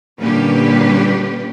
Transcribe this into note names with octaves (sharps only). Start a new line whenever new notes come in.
A#2 D3 G3 C#4 G4 B4